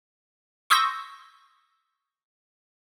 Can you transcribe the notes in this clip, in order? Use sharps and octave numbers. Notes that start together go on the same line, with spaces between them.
C6 C#6 D#6 E6 G6 A#6